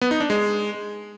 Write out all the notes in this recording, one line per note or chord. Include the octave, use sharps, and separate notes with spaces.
B3
D#4
D4
G#3